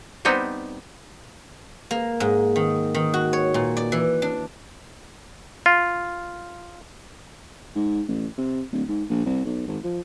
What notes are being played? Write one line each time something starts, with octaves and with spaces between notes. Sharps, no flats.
G3 B3 C4 D#4
A#3
G#2
D#3
D#3
F#4
C#5
A#2
D5
E3
D4
F4
G#2
A1
C3
D1
G#2
A#1
C2
B1
G#1
F3